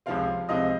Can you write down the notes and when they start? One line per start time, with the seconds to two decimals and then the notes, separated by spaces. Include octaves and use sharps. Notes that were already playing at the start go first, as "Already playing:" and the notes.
0.06 C#2 C3 F3 C4 F5
0.49 C#2 C3 F3 C4 D#5